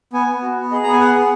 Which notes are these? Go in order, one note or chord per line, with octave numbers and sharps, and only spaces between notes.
B3 G#5
B3
F#4
B3
G#4 D#5
B3 A#5
G#5
G#4 F#5
B3